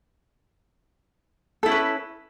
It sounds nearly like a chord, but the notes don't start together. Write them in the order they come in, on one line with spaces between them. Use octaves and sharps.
A4 E4 C#4 B4